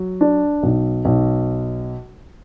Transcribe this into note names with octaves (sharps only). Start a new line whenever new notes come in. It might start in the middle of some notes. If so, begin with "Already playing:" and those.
Already playing: F#3
D4
B1
B1